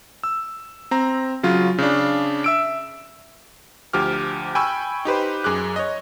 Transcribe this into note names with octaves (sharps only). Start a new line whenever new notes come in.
E6
C4 A#5
C#3 F#3 F4
C#3 D4
E5 E6 D7
D2 F3 G4 D6 F6
G5 G#5 B5 C#6 E6
D#4 G4 B4 C5
F#2 G#4 D6 F#6
C#5 D#5